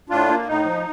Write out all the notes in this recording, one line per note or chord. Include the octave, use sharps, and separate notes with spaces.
A2 D4 F4
A#3
A2 D#4
F3